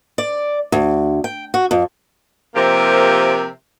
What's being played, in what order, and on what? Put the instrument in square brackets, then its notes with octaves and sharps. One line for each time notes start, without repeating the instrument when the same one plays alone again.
[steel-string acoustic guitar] D5
D2
G5
F#4
F2
[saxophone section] C3 F3 A#3 G4 A#4 E5